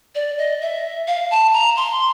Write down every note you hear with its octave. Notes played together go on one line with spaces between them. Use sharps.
D5
D#5
E5
F5
A5
A#5
C6